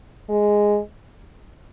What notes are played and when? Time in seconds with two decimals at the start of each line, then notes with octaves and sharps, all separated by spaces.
0.30 G#3